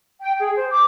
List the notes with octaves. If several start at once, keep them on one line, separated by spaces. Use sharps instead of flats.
G5
G#4
C5
D6